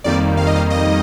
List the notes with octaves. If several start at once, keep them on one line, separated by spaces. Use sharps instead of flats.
F2 D#3 G3 A#3 D5
F5
D#5
F5
D#5